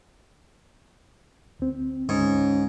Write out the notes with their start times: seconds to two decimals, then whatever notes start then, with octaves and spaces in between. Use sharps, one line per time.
1.60 D2 C4
2.09 D2 G#2 C#4